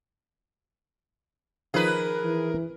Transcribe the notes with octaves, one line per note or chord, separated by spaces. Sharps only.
D#3 F3 G#4 A#4 B4 F5
E3